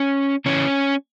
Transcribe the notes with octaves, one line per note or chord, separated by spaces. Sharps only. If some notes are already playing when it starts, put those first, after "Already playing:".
Already playing: C#4
C#3 E3 C#4